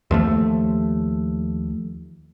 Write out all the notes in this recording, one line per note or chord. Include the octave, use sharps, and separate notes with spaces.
D#2 F3 A3